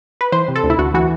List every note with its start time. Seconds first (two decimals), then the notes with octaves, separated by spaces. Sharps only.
0.21 B4
0.32 E3 C5
0.48 C3
0.56 A4
0.63 D2
0.70 E4
0.79 D2 F#4
0.94 E3 F#4